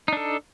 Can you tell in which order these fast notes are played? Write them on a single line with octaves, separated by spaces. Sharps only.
D#4 D4 A4